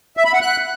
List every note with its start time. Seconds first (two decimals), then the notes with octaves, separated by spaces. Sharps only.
0.17 E5
0.25 B5
0.34 F#5
0.42 F#6